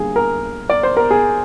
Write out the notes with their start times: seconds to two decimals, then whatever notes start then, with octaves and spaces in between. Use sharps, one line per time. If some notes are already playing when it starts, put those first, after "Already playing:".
Already playing: D3 G3 A#3 G#4
0.16 A#4
0.70 D5
0.83 C5
0.97 A#4
1.11 G#4